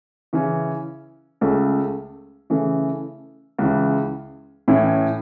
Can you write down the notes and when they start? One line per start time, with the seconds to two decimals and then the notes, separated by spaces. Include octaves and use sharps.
0.33 C#3 E3 C#4
1.41 C#2 C#3 A3
2.50 C#3 E3 A3
3.59 C#2 C#3 E3
4.68 A2 E3 C#4 E4